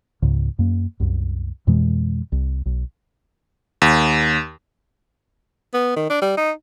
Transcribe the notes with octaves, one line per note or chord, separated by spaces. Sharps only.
C#2 G#2 C#3
F#2 A#3
C2 F#2
F2 B2 E3 G#3
C2
B1
D#2
B3
D#3
D4
G3
D#4